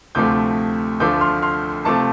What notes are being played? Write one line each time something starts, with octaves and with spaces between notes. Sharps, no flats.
D2 C3 F3 A3 D6 G6
D2 D3 F3 A3 D6 G6
C6 F6
C6 F6
C3 F3 A3 A5 D6